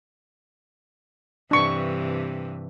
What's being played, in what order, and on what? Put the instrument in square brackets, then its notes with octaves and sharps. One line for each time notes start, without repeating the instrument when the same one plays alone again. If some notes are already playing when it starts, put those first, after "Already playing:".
[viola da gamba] G2 C3 E3 [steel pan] D4 C#6